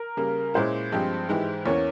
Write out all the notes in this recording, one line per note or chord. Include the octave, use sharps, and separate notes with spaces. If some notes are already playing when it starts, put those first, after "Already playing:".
Already playing: A#4
C#3 G3 A#3
A#2 G#3 C#4 E4 C5
G2 F3 G#3 C4 G4
G#2 E3 G#3 E4 G4
E2 E3 A#3 C#4 C#5